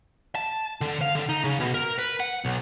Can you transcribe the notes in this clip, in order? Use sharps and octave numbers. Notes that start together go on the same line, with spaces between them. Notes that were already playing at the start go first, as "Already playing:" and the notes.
A5
D3
F5
D3
D#4
C#3
B2
A#4
B4
F#5
B1